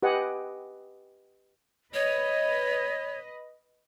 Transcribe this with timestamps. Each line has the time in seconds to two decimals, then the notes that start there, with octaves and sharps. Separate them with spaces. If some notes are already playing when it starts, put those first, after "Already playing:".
0.03 G4 B4 D#5 F#5 G#5
1.94 B4 C#5 D#5